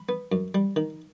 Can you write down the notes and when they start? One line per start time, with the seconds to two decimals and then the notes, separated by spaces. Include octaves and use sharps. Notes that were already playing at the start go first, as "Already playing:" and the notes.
Already playing: B5
0.09 B3
0.32 F#2
0.55 G3
0.76 D#3